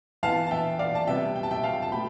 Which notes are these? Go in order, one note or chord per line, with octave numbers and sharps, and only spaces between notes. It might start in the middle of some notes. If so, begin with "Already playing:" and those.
E3 B3 F5 A5
A5
E5 G5
D5 F5
A5
C3 G3 B3 E5 G5
G5
A5
E5 G5
F5 A5
A5
B2 A3 G5 B5